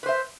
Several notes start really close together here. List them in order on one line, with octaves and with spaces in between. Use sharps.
B4 C5 E5